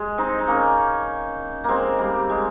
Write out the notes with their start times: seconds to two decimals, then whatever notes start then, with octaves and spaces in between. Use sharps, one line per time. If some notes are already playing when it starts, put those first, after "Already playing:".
Already playing: G#3
0.18 C4 D#4
0.40 D#4
0.48 A#3 C#4
1.64 G#3 A#3 C4
1.99 G3 A#3
2.29 G#3